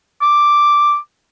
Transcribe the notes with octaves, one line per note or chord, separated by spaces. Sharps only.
D6